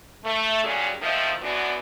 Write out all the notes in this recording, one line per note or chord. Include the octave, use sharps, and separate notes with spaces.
A3
A#2 F#3 G3 C#4 G#4
D#3 F3 A3
F#2 E3 B3 D4 F#4